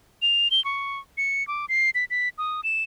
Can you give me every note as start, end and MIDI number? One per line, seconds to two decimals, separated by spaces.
0.22 0.51 101
0.51 0.63 103
0.65 1.00 85
1.18 1.46 97
1.48 1.66 86
1.69 1.90 96
1.95 2.05 95
2.10 2.29 95
2.38 2.61 87
2.64 2.84 100